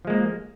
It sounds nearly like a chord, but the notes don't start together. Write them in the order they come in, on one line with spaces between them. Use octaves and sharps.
F3 G#3 A#3